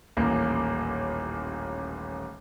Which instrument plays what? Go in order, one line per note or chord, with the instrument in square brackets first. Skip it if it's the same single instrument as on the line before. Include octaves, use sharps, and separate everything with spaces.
[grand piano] D#1 A1 A#3